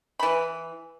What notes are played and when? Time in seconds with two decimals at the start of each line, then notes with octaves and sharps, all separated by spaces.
0.19 E3 B5